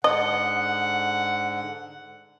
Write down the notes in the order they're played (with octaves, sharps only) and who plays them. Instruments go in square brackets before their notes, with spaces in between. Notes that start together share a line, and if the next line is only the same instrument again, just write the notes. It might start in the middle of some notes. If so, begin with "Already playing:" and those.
[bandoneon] G#2 D3 [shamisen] D#5 [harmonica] F#5